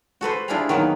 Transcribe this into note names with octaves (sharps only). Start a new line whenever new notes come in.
F#4 A4 B4 C5
D4 E4 F4 G4 G#4 A#5
D#3 F#3 A#3 B3